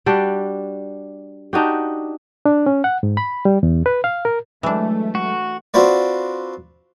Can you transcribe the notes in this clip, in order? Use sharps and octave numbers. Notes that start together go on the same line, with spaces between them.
G3 D4 F#4 G4
D4 D#4 F#4 G4
D4
C#4
F#5
G#2
B5
G3
E2
B4
F5
A#4
E3 F#3 G#3 A3 D4
F#4
C4 D4 F4 F#4 B4 D5